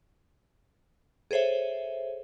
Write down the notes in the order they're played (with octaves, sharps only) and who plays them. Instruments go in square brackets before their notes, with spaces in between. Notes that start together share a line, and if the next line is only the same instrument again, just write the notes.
[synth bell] G#4 A4 C5 C#5 E5